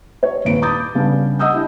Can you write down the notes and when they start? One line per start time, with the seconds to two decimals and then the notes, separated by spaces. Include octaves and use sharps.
0.23 C#5
0.45 D#1 G#1 A#2 B4 D7
0.62 B5 D6 D#6 G6 A6
0.95 C#3 G3 B3 C#4 D4
1.39 D#5 F#5 D#6 E6 G6
1.52 D4 E4 G4